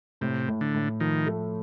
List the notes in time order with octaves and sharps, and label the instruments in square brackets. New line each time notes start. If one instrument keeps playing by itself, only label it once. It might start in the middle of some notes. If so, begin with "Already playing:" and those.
[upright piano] A2 [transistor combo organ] C3
[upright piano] A2
[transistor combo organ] D3
[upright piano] A2
[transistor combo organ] D#3 [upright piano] F3
[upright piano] A3